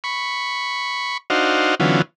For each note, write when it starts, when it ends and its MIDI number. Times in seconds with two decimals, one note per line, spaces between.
0.04 1.17 83
0.04 1.17 85
1.30 1.75 62
1.30 1.75 63
1.30 1.75 66
1.30 1.75 72
1.30 1.75 77
1.80 2.02 50
1.80 2.02 52
1.80 2.02 54
1.80 2.02 59
1.80 2.02 61
1.80 2.02 65